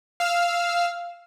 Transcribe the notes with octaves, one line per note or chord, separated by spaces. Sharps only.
F5 E6 F6